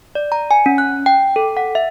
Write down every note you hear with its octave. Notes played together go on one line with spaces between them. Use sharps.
D5
A#5
G#5
C#4
F#6
G5
A4
F#5
E5